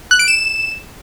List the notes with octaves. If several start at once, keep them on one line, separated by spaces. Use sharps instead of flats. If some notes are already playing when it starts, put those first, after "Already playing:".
F#6
D7
E7